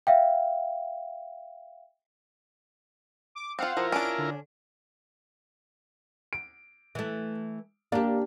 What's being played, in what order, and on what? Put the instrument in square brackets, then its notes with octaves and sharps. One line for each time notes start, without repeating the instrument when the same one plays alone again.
[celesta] E5 F5 G5
[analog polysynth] D6
[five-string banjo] C4 F4 [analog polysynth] C5 F5 F#5
[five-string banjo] F3 [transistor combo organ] E4 F4 A#4
[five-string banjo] C#4 D4 [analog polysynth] D7
[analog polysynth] D3
[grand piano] D7
[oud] E3 A3
[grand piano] A#3 [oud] D4 G4